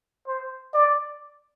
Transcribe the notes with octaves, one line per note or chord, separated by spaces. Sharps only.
C5
D5